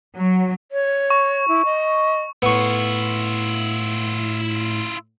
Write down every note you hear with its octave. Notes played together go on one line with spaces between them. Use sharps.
F#3
C#5
C#6
E4
D#5
A2 B3 E4 F4 C#6